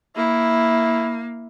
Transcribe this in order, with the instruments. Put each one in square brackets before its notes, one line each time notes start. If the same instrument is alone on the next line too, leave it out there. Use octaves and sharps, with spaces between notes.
[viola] A#3 [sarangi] E4